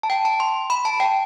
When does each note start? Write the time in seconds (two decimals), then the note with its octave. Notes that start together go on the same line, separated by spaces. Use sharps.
0.03 A5
0.10 G5
0.25 A5
0.40 C6
0.70 B5
0.85 A5
1.00 G5